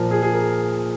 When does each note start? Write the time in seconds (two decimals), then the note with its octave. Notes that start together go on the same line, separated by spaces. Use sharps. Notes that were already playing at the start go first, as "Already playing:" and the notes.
Already playing: A#2 F3 A#4
0.11 G#4
0.22 G#4
0.33 A#4